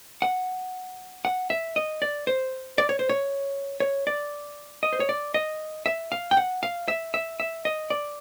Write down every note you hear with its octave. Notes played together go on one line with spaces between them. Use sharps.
F#5
F#5
E5
D#5
D5
C5
D5
C#5
C5
C#5
C#5
D5
D#5
C5
C#5
D5
D#5
E5
F5
G5
F#5
F5
E5
E5
E5
D#5
D5